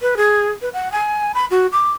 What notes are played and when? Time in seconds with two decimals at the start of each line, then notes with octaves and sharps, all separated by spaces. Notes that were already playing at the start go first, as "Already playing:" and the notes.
0.01 B4
0.17 G#4
0.62 B4
0.73 F#5
0.92 G#5
1.35 B5
1.51 F#4
1.72 D6